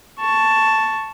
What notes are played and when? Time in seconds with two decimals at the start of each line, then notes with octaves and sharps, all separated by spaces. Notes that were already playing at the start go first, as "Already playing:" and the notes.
0.20 A5 C#6